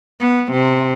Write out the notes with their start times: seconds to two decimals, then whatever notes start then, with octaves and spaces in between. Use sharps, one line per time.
0.21 B3
0.52 C3